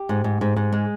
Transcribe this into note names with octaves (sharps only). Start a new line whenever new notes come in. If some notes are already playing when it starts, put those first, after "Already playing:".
Already playing: G4
G#2
G#2
G#2
G#2
G#3